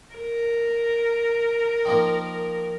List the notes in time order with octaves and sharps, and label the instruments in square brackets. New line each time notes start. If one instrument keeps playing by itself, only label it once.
[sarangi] A#4
[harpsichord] D#3 F3 A#3